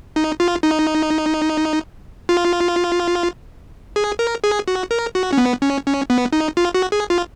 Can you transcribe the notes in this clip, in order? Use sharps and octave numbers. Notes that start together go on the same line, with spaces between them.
D#4
F4
D#4
F4
G#4
A#4
G#4
F#4
A#4
F#4
C#4
B3
C#4
C#4
B3
D#4
F4
F#4
G#4
F4